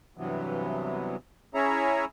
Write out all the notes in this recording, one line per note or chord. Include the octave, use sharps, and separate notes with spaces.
G2 C3 E3 F#3 B3
C#4 E4 G#4 C#5 E5 A#5